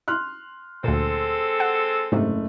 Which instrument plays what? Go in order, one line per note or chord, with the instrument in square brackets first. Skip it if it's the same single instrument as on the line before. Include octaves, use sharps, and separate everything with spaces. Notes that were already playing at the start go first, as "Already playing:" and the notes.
[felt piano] C6 F6 F#6
[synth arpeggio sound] D2 A#2 [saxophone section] G#3 C4 A4
[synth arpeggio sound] F#5
[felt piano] F#1 A3 [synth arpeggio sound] G#2 C3